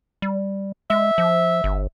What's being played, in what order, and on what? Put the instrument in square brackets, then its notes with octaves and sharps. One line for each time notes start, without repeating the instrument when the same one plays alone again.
[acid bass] G3
[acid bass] G#3 [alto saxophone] E5
[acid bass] F3
G1